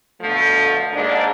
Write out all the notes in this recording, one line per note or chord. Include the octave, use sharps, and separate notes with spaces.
B2 D3 F3 A3
D#2 G#2 G#3 A#3 D4